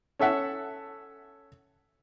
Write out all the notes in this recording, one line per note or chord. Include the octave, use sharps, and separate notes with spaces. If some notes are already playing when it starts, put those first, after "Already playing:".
C#4 A4 E5 F#5